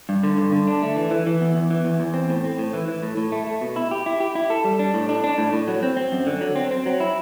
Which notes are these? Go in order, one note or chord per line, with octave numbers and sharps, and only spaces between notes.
G2
D3
G2
D3
D4
A3
E3
E3
E3
E2
E2
E3
E2
E2
C4
A2
C4
A2
E3
E3
A2
A2
A3
A3
B2
E4
G4
E4
G4
E4
A4
G3
D4
A2
D4
D4
A2
A2
F#3
C4
C4
F#2
D3
F#3
C4
C4
F#3
E4